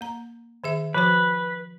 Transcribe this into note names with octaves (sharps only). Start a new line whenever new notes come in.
A#3 A#5
D#3 G#4 E5
F3 F#4 B4 C5